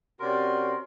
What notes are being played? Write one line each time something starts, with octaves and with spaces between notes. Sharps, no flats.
C3 C#4 F#4 A#4 D5 C6